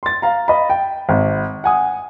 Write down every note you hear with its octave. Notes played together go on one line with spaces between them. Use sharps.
C6 A6
F5 A#5
D#5 B5
G5
G#1
F#5 G#5 D#6